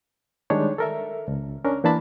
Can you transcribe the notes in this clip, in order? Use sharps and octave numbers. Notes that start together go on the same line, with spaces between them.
D#3 G3 G#3 D4 D#4 C#5
A4 A#4 E5
C#2
C#4 D4 A#4
E3 A#3 D4 E4 A5 B5